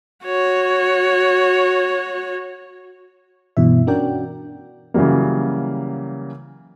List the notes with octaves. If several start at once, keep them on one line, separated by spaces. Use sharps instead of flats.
F#4 C#5
G2 B2 E3 E5
C#4 D4 F#4 A#4 D5 G5
C#3 E3 F#3 G3 A#3